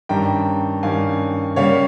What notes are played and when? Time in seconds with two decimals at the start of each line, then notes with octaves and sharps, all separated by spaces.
0.09 G2 D#3 G3 C#4 G5 A#5
0.83 G2 D#3 G3 C#4 F5 G#5
1.56 C#3 G3 A#3 C#4 C#5 F5